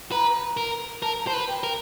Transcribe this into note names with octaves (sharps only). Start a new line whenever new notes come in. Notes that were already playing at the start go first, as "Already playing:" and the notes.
B4 A#5
A#4
A#4 A5
A#5
C5 A5
B4
G5
A#4